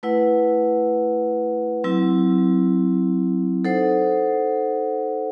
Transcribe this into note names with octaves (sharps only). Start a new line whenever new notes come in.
A3 E4 B4 F#5
F#3 C4 E4
D#4 A4 C5 F#5